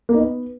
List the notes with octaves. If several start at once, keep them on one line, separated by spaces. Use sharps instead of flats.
A#3
D#4
B3